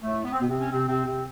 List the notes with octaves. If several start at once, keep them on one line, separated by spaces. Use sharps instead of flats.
A2 A3
B3
C4
B2 B3
C3 C4
C#4
C3 C4
C3 C4
C3 C4